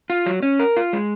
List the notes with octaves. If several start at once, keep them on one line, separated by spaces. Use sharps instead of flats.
F4
F#3
C#4
A#4
F4
G#3